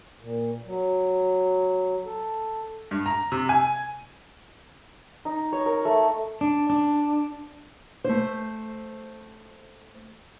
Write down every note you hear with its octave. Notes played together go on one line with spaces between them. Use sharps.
A#2
F#3
A4
G2
A#5
C3
G#5
D#4
C#5
A#4
A3
D4
D4
A3 C5